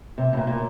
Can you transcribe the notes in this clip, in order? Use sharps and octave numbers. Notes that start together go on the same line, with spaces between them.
C3
A2
A#2
A#2